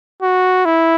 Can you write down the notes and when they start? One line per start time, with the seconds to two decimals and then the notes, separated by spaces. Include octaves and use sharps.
0.22 F#4
0.66 E4